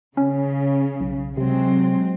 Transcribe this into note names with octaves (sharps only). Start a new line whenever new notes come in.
C#3 C#4
B1
C3 F#3 G#3 C4